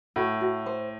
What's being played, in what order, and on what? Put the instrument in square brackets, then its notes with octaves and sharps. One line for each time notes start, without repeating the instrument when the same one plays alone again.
[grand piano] A2 [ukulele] F#4
[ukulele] F#4
C5